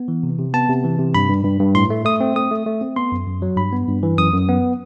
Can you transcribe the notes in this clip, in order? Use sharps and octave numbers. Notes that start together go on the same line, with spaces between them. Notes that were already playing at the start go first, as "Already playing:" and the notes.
Already playing: B3
E3
C3
C3
B3 A5
C3
E3
C3
G2 B5
G2
G2
G2
A2 C6
A3
A3 D#6
C4
A3 D#6
A3
A3
C4
B3 C6
F#2
F#2
F#3
G2 B5
B3
G2
E3
F#2 D#6
F#2
B3